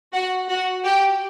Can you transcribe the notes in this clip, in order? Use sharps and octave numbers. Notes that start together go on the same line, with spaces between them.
F#4 F#5
F#4 F#5
G4 G5